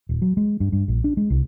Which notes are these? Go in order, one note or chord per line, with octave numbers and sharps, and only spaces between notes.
D#1
F#3
G#3
G2
G2
A#1
D4
G#3
C2